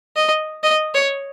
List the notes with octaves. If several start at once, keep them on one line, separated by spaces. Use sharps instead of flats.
D#5
D#5
C#5